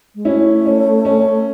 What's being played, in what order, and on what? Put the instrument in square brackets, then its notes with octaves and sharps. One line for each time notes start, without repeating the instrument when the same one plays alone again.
[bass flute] G#3
[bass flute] A3 [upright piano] C#4 E4
[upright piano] C#4
C#4